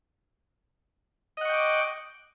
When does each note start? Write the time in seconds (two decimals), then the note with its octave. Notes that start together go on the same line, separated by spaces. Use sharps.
1.37 D#5
1.41 F#5
1.45 C#6
1.49 G5
1.53 D6